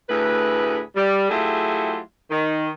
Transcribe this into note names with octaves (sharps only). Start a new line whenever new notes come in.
D2 A2 G#4 B4
G3
F#3 A3 E4 F4 G4 G#4
D#3